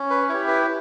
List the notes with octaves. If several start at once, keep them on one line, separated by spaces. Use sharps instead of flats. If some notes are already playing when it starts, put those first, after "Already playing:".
Already playing: C#4
B4
E4 G4 C#5
B4